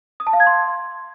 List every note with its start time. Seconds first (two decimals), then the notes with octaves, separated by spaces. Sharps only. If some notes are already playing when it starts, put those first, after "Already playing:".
0.20 D#6
0.27 A5
0.33 F5
0.40 G#6
0.47 C6